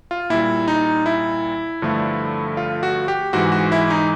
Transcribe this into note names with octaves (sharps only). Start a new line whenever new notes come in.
F4
A#2 G3 E4
D#4
E4
G2 D3 F3 A3
F4
F#4
G4
G#2 E3 G#3 F#4
F#4
E4
D#4